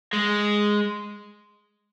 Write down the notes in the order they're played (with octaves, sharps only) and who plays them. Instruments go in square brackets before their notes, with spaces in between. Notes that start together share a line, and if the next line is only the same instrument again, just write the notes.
[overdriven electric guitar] G#3